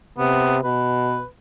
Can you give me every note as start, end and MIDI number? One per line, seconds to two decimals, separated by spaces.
0.18 0.61 48
0.18 0.57 59
0.64 1.23 47
0.64 1.26 71